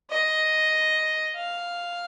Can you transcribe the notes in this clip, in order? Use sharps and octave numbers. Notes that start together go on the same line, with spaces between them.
D#5
F5